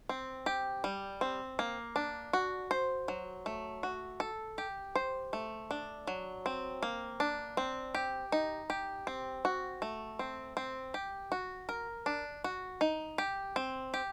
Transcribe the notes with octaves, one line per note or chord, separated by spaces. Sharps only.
C4
G4
G3
C4
A#3
D4
F#4
C5
F#3
A3
F#4
A4
G4
C5
A3
D4
F#3
C4
A#3
D4
C4
G4
D#4
G4
C4
F#4
A3
C4
C4
G4
F#4
A#4
D4
F#4
D#4
G4
C4
G4